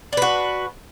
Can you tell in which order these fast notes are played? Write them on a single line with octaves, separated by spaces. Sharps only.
D4 B4 F#4